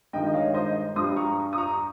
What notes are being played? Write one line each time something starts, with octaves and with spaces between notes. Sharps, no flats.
G2 D#3 G#3 D#5 G5
D#5
C#5 F5
C5 D#5
G2 G3 C6 D#6
A#5 C#6
D#6
A#5 C#6